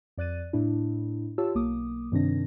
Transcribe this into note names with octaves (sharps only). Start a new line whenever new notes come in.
F2 D5 F#6 A6 D#7
A2 D4 E4
F4 G4 C#5 A5 E6
B1 A#3 D6 D#6
G2 C3 D#3 C4 D4 A#6